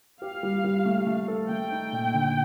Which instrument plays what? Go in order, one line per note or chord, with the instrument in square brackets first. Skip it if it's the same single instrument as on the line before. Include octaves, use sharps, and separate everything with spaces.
[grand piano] G4 [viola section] F5
[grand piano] G3
G3
A3
A3
A4
[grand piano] A3 [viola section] G5
[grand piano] D#4
A#2
D3